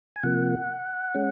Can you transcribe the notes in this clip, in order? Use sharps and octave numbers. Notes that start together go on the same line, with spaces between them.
G#5
C3 F3 A#3 F#5
G#3 C#4